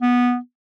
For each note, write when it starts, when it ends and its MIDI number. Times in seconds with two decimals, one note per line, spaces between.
0.02 0.37 59